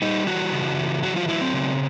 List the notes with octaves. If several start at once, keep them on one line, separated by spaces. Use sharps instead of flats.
G3 D#4
E3 F#4
C#3
E3
F#3 F#4
F4
F#3 E4
C4
C#3